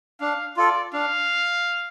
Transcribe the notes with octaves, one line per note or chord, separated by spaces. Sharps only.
D4 F5
F4 A4 D5
D4 F5